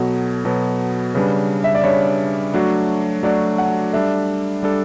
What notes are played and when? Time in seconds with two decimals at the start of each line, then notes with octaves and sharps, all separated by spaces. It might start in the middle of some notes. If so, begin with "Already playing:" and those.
Already playing: B2 F#3 B3 A4
0.45 B2 F#3 B3
1.14 C#3 G3 D4 B4
1.64 E5
1.75 D5
1.84 C#3 G3 D4 C#5
2.54 F#3 A3 D4 F#4
3.23 F#3 A3 D4 F#4 D5
3.58 F#5
3.93 G3 D4 A4 E5
4.63 G3 D4 A4